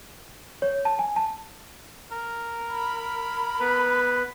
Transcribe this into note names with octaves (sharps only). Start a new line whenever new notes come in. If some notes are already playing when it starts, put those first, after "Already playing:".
C#5
A5
G#5
A5
A#4
B5
B3 B4